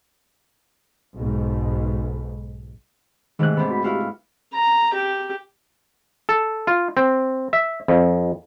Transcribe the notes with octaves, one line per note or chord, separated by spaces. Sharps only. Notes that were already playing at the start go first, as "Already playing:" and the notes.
B1 G#2
G#2 C3 D#3 A3 F#6
B3 C4 D4
F#4 B5
E4 F#4 G4 F5
A#5
G4
A4
F4
C4
E5
F2